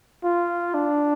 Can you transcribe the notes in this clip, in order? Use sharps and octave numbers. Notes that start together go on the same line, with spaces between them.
F4
D4